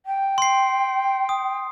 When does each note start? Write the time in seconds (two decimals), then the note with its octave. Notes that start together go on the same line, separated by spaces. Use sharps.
0.06 G5
0.38 C6 C7
1.29 D#6